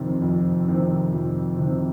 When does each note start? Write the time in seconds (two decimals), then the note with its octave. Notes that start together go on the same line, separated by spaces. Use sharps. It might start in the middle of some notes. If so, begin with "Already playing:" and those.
Already playing: F2 C3 D#3 C4
0.22 F2
0.67 C3 D#3 C4
1.13 F2
1.58 C3 D#3 C4